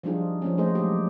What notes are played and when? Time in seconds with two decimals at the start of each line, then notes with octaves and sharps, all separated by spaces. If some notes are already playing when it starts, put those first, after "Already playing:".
0.03 F3 G3 D4 D#4 F4 G#4
0.42 F3 A#3 C#4
0.58 A3 D#4 G#4 C5 D#5
0.75 F#3 G#3 A#3 G4